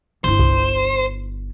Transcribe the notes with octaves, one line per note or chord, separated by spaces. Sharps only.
G1 E4 C5
C2